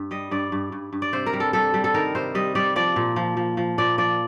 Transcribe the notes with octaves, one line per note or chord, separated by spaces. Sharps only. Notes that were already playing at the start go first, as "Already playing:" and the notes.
Already playing: G2
G3 D#5
G2 D5
G2
G2
G2
D5
C3 C5
A#4
G3
A4
G3 A4
G3
A4
D#3 A#4
C3 C5
G3 D#5
G3 D5
F3 D5
A#2
F3
F3
F3
A#2 D5
F3 D5